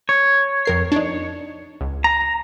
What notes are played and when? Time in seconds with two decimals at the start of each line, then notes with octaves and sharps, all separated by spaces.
0.09 C#5
0.65 F2 A#4 C7
0.92 D4 D#4
1.81 C#2
2.04 A#5